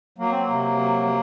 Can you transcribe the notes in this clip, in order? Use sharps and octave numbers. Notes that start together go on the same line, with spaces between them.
F#3 A#3
C4
A#3
C3
F#3
F#3